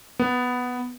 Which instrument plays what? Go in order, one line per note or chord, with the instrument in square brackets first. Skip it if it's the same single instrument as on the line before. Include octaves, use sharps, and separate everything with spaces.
[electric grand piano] B3